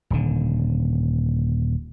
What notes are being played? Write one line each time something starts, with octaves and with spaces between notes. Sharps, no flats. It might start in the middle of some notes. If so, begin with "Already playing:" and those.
D#1 D3